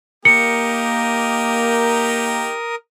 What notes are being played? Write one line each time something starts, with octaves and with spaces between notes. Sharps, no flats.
A#3 D#4 G4 A#4 D#6 C#7